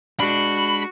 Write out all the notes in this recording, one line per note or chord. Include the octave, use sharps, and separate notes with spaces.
G#3 D4 F#4 B5